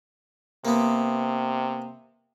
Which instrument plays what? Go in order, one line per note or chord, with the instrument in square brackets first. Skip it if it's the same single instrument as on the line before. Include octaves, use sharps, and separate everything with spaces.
[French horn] C3 [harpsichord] A#3 B3